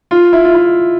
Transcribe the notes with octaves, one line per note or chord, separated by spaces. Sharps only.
F4
E4
F4
E4